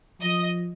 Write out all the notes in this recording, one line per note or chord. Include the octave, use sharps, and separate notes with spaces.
F3 D#5